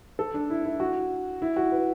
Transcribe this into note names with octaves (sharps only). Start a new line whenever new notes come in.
A4
D4
E4
E4
F#4
E4
F#4
B4